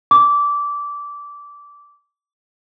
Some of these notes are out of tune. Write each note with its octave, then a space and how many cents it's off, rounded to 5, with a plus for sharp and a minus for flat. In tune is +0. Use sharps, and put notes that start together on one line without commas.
D6 -15